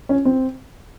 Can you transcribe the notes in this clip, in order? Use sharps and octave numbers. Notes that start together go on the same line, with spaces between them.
C#4
C4